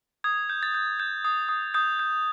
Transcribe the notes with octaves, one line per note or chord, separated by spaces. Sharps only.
D#6 G#6
G6
A6
G6
G6
D#6
D#6
D#6 G6
G6